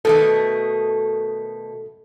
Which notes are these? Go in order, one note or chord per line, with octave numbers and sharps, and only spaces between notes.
B2 D#3 A3 A4